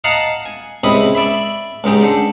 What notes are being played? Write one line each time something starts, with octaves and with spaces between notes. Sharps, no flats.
D#5 F5 F#5 A5 A#5
G#5
C#2 C3 E4 D#5 B5 D#6
D5 E5 B5
C#2 G#2 G#3 D#4 G4
D3